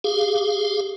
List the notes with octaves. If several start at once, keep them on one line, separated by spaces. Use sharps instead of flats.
G4 G#4 F5